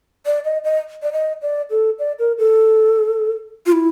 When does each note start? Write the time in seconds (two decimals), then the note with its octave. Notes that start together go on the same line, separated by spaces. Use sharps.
0.26 D5
0.45 D#5
0.64 D#5
1.03 D5
1.13 D#5
1.42 D5
1.70 A4
1.99 D5
2.19 A#4
2.38 A4
3.66 F4
3.72 E4